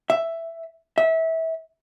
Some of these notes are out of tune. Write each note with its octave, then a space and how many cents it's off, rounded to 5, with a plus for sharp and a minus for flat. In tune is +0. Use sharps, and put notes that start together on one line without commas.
E5 +5
E5 -25